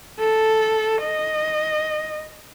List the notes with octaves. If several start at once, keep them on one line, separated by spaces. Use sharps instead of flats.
A4
D#5